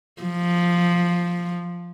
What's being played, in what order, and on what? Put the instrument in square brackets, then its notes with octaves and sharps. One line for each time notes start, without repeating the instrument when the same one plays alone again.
[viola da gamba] F3